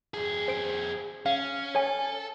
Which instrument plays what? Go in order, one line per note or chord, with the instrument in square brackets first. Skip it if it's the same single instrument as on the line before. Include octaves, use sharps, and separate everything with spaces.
[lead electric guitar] F2 G#4
[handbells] C5 D7
[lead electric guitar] C#4 [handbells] F5
[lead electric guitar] A4 [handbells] C#5 G#5